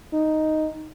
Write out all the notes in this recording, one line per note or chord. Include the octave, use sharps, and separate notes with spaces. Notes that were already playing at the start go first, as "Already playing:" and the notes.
D#4